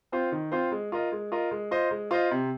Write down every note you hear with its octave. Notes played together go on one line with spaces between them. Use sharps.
C4 F4 C5
D#3
C4 F4 C5
G#3
F4 A#4 D#5
G#3
F4 A#4 D#5
G#3
F4 C5 D#5
G#3
F4 C5 D#5
C3